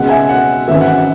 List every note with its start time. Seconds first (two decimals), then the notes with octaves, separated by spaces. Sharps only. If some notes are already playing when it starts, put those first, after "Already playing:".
Already playing: C#2 B2 G#3 F#5
0.09 E5 G#5
0.29 F#5
0.68 G#1 F#2 E3 E5
0.81 F#5